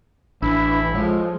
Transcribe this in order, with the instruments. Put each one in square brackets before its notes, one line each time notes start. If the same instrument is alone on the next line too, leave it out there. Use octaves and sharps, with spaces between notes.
[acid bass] A1 [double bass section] E3 [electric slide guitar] D4 [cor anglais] E4
[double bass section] F3 G#3 [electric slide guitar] A4 C#5